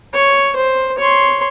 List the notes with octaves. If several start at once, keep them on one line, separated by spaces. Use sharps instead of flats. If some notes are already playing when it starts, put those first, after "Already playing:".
C#5
C5
C#5 C6